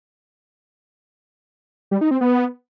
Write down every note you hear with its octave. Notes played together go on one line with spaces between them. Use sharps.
G3
D#4
C4
B3